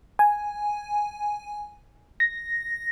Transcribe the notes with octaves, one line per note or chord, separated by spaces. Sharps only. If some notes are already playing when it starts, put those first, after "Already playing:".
G#5
A#6